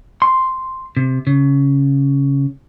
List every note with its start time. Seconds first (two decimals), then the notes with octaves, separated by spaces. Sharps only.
0.22 C6
0.97 C3
1.27 C#3